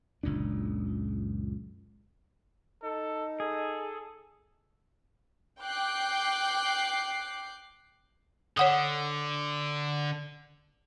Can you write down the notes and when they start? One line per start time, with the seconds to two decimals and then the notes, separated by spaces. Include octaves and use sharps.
0.23 F#1 C#2 A#2 D4
2.83 D#4 A4
3.40 G#4 A4
5.62 G5 D6 F#6 C7
8.57 D3 C#5 F#5 D#6